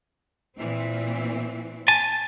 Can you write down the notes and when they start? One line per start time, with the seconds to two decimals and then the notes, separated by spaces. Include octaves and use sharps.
0.57 A#2 E3 C4
1.88 G#5 A5